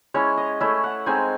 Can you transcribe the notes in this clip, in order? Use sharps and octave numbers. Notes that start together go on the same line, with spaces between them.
G#3 C#4 E4 C#5
D#5
A3 C#4 E4 E5
F#5
G#3 C4 D#4 G#5